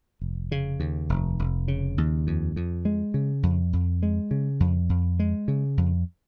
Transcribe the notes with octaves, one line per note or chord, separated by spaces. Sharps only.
F1
C#3
D#2
F1
F1
C#3
D#2
F2
F2
G#3
C#3
F2
F2
G#3
C#3
F2
F2
G#3
C#3
F2